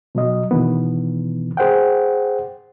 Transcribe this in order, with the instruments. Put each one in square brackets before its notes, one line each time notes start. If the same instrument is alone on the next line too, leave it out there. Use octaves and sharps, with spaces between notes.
[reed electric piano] B2 F#3 D#5
B2 D#3 E3 B3
G#4 C5 F#5 G5